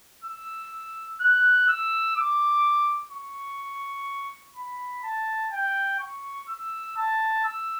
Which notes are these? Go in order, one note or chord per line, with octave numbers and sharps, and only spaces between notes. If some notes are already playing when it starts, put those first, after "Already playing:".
E6
F#6
E6
D6
C#6
B5
A5
G5
C#6
E6
A5
E6